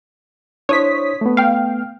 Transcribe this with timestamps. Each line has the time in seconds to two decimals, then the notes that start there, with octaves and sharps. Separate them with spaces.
0.69 D4 E4 C5 C#5 D#6 B6
1.21 A3 B3
1.37 F5 G5